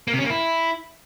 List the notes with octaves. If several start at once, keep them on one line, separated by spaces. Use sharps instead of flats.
A#3
C3
C#4
A#3
E4